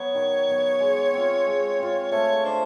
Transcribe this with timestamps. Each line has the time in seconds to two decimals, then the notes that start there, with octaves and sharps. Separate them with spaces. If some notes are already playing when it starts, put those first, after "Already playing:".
Already playing: F#3 B3 C#5
0.15 D#3
0.48 F#3 B3
0.80 G#3
1.14 C4 F4
1.46 G#3
1.79 C4 F4
2.12 A3 C#5
2.44 D4 G4 C5